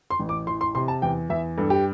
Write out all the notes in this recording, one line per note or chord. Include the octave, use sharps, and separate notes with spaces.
C6
A1
D6
E3 C6
C6
C3 C6
A5
E2 G5
E2 E5
G2 A4
G4